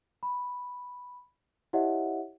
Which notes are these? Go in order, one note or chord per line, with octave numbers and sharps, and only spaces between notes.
B5
E4 G4 C#5 D#5 E5 F#5